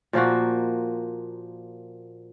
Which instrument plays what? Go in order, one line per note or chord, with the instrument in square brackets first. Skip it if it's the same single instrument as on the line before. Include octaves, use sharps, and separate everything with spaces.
[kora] A#2 F3 A#3 F#4